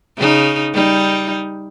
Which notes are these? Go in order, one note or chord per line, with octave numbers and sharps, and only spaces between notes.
C#3 D#4
G3 D#4